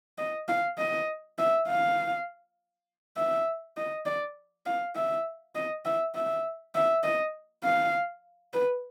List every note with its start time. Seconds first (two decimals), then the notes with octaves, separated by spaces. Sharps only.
0.18 D#5
0.48 F5
0.78 D#5
1.39 E5
1.68 F5
3.17 E5
3.77 D#5
4.06 D5
4.66 F5
4.95 E5
5.55 D#5
5.85 E5
6.15 E5
6.75 E5
7.03 D#5
7.64 F5
8.53 B4